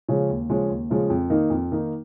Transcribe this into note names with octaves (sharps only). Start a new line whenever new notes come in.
C#3 F3 G#3 C#4
D#2
C#3 F3 G#3 C#4
D#2
C#3 F3 G#3 C#4
F2
D#3 A#3 D#4
F2
D#3 A#3 D#4